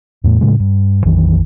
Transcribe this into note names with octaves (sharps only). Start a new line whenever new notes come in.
E2 A2 A3
A2 C#3 G#3
G2
A#1 F2 D#3 E3